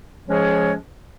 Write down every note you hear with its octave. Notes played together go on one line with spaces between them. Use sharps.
F3 G#3 C#4 G#4 C#5